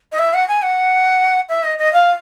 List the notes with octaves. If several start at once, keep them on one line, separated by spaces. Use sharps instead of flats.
D#5
E5
F#5
G#5
F#5
E5
D#5
D#5
F5